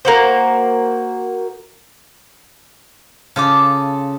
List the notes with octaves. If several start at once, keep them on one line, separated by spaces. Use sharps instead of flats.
A#3 F#4 C5
C#3 F4 A4 D6